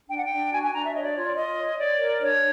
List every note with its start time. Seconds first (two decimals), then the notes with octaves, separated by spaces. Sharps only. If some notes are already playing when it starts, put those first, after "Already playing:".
0.09 D4 G5
0.17 F#5
0.24 G5
0.30 D4
0.51 F#4 G#5
0.62 G#5
0.72 D4 A#5
0.83 E5
0.94 C#5 D#5
1.04 D5
1.14 F4 C#5
1.26 D5
1.36 F4 D#5
1.57 C#5
1.78 C#5 D5
1.99 A#4
2.20 D4 C#5